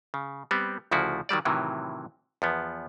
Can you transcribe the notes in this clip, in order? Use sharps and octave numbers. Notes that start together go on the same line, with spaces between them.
C#3
G3 B3 C4
D2 C#3 F3 E4 F#4
D#3 F#3 G3 D5
A2 C3 D#3 E3 F#3
E2 F3 B3